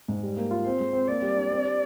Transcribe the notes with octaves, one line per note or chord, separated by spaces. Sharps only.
G#2
G3
A#3
F4
C4 C5
G#3
C4
A#3 D5
G3
D4
C4
G4